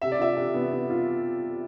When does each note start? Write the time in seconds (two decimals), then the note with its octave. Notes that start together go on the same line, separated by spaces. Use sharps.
0.02 C3 E5
0.12 D5
0.19 F4 E5
0.37 C3
0.54 B3
0.72 B3
0.90 F4